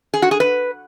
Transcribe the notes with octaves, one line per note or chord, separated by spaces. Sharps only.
G#4
F#4
G#4
B4